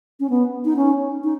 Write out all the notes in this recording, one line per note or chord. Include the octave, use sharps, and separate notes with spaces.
C#4
B3
D#4
C#4
D#4